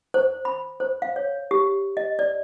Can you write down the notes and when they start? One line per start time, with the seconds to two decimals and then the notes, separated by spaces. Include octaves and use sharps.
0.14 C5
0.45 B5
0.80 C5
1.02 F5
1.16 C#5
1.51 G4
1.97 D#5
2.19 D5